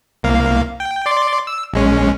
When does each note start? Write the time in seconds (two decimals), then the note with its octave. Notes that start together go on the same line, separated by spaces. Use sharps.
0.23 C2 A#3 F5
0.80 G5
1.06 D5 C6 D6
1.47 E6
1.74 A#1 G#3 C#4